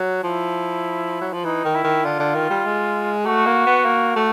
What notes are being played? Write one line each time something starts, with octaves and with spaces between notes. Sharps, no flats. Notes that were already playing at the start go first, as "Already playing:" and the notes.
Already playing: F#3
F3 E4
F#3
F3
E3 D#4
D#3
E4
D#3
D3 F4
D3
D#3
G3
G#3
A3 F#4
A#3
B3
A#3
A3